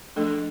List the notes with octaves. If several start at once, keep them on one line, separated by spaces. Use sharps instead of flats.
F3 A3 D4 A4